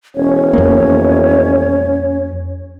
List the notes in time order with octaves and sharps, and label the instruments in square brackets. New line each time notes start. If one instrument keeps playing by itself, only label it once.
[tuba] E1 [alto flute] C#4 [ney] C#5
[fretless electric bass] F2 A#3